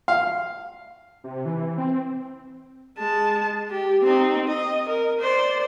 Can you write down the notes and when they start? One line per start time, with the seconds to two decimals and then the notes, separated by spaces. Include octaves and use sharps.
0.08 F5
1.24 C3
1.45 E3
1.78 C4
2.98 G#3 A5
3.70 G4
4.03 C4 D#4
4.47 D#5
4.88 A#4
5.21 C5 D5